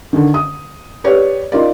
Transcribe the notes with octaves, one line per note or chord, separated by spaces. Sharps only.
D3 D#3
D#6
G4 B4 C#5 D5
D#4 F4 A#4 D5